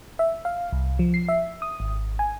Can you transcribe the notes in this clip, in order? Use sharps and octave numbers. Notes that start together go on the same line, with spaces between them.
E5
F5
C2
F3
C7
E5
D#6
G#1
G#5